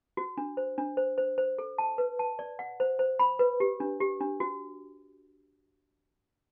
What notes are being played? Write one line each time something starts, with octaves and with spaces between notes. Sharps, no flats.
F#4
D4
C5
D4
C5
C5
C5
A4
A5
B4
A5
D5
F#5
C5
C5
B5
B4
G4
D4
G4
D4
F#4